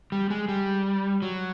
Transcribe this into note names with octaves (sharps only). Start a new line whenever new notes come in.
G3
G#3
G3
F#3